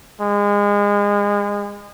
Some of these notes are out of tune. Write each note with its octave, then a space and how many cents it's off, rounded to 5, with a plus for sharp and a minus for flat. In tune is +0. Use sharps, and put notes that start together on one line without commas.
G#3 -30